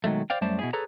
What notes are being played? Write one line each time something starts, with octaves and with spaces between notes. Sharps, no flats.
B2 D#3 F#3 G#3 A3
C5 D5 F5 G5
F#2 G3 A3 C5 D5 A5
B2 E4 G#4
G#4 A4 B4 C#5 A#5